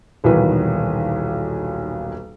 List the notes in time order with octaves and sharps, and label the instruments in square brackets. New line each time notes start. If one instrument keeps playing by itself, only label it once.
[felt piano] D#1 B1 D#3 E3 B4